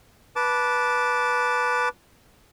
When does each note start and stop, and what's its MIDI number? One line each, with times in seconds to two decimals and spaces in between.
0.36 1.89 71
0.36 1.89 81
0.36 1.89 86